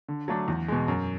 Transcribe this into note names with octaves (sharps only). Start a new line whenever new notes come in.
D3
F#3 A3 D4
E2
B2 G#3
F#2